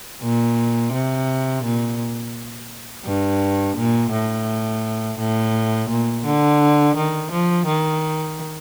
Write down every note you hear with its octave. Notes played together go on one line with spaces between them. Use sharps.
A#2
C3
A#2
G2
A#2
A2
A2
A#2
D3
D#3
F3
D#3